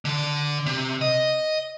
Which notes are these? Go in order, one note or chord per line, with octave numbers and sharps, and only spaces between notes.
D3 D5
C3
D#5